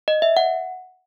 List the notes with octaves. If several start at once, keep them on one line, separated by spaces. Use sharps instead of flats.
D#5
E5
F#5